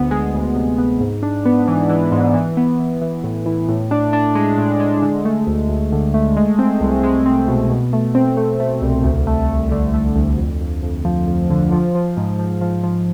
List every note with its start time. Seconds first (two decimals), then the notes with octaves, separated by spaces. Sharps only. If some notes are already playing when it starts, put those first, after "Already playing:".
Already playing: D2 B3
0.11 G#3
0.34 D2
0.56 C3
0.78 B3
1.00 G#2
1.23 D4
1.45 B3
1.68 E3
1.89 E3
2.12 G#2
2.34 E3
2.57 B3
2.79 E3
3.01 E3
3.24 A2
3.46 E3
3.69 A2
3.91 D4
4.13 D4
4.35 G#3
4.58 A2
4.80 G#3
5.02 D3
5.25 A3
5.47 D2
5.69 D2
5.92 D3
6.14 A3
6.36 G#3
6.59 C4
6.81 C2
7.03 G#3
7.26 C4
7.48 B2
7.70 B2
7.93 A3
8.15 C4
8.37 A3
8.60 A3
8.82 C2
9.04 D2
9.27 A3
9.49 D2
9.71 D3
9.94 A3
10.16 D2
10.38 F2
10.61 F2
10.83 F2
11.05 F3
11.27 F2
11.50 D3
11.72 F3
11.95 F3
12.17 G#2
12.39 F3
12.61 F3
12.83 F3